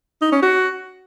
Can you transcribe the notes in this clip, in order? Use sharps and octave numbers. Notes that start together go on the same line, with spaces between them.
D#4
C#4
F#4